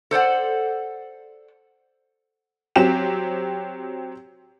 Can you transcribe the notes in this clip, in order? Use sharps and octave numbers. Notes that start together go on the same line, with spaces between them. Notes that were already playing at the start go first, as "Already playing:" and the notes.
A4 C5 D5 F#5
F#3 C4 G4 E7